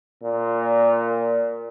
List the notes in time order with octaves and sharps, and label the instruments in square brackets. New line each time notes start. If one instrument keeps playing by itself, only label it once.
[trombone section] A#2